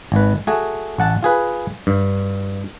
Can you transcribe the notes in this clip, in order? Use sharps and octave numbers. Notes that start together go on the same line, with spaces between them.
G#1 B4
A3 F#4 G#4
A1 F#5 A5
F4 G#4 B4
G2